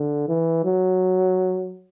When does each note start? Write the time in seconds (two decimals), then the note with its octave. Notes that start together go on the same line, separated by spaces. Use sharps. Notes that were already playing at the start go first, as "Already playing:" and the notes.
Already playing: D3
0.28 E3
0.65 F#3